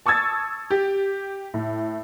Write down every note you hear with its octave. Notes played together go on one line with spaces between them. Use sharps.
A5 C#6 D#6 E6 G#6 A6
G4
A2